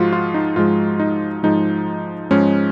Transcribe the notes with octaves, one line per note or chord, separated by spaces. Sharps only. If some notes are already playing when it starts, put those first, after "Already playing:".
Already playing: G#2 F3 G#3 F4 F#4
F4
D#4
G#2 F3 G#3 F4
D#4
G#2 F3 G#3 D#4
G#2 F3 G#3 C#4